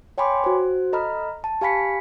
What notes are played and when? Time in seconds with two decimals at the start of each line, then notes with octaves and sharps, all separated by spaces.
0.18 C#5 G5 G#5 B5 C6 D6
0.44 F#4 C5
0.93 A4 D#5 A#5 B5 F6
1.44 A5
1.61 G4 F5 G#5 B5 B6 C#7